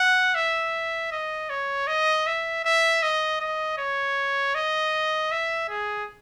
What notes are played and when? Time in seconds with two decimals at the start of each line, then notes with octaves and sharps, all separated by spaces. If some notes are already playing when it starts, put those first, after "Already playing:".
Already playing: F#5
0.35 E5
1.12 D#5
1.50 C#5
1.87 D#5
2.27 E5
2.65 E5
3.03 D#5
3.41 D#5
3.78 C#5
4.55 D#5
5.31 E5
5.69 G#4